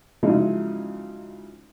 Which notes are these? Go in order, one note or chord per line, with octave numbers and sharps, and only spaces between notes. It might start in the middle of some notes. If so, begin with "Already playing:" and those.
C#3 F3 F#3 G#3 D#4 E4